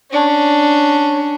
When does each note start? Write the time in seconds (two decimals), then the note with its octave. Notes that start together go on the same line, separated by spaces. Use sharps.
0.11 C#4 D4